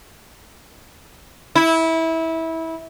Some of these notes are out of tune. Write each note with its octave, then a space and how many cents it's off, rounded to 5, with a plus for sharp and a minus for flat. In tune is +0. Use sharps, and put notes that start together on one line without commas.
E4 -20